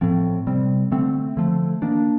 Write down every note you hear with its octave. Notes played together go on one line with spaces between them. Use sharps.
A2 F3 C4
C3 G3 C4
D3 A3 C4
D3 F3 A3
D#3 A#3 D4